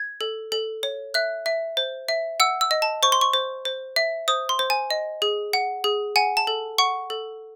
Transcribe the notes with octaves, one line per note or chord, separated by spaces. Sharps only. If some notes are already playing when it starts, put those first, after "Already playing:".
Already playing: G#6
A4
A4
C#5
E5 F#6
E5
C5
E5
F#5 E6
E6
D#5
A5
C5 C#6
C6
C#6
C5
C5
E5
C5 D#6
C6
C5
G#5
D#5
G#4
F#5
G#4
F#5 G#5
A5
A4
F#5 C#6
A4